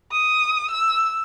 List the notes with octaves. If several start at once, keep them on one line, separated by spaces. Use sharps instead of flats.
D#6
E6